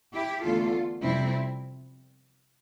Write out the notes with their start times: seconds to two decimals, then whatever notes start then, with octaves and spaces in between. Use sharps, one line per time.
0.13 E4 G4
0.43 E2 D3 A3 F4 A4
1.02 F2 C3 G3 C4 E4